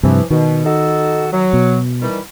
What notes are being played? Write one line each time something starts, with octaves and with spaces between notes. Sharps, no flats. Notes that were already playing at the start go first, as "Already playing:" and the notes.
G2 C3 E3 F3
B2 D#3
D#4 F#4 A4
F#3
B2
D#3 E3 G3